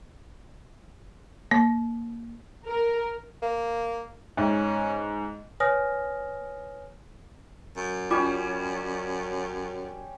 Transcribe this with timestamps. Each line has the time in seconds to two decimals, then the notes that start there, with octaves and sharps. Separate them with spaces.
1.51 A#3
2.66 A#4
3.42 A#3
4.37 G#2 C#4
5.60 B4 C#5 G#5 D#6 F6 A#6
7.76 F#2
8.11 G3 C#4 F4 D6